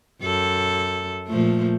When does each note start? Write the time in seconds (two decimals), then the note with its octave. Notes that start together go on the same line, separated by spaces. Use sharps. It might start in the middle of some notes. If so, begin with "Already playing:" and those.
0.22 F#2 A4
1.28 A#2 F3 A3